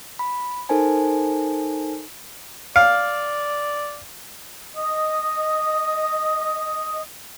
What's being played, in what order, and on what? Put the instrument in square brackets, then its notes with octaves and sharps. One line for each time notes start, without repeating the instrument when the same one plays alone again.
[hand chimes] B5
D#4 A4 A#4 C5 G#5 A5
[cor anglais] D5 [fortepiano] F5
[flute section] D#5 D#6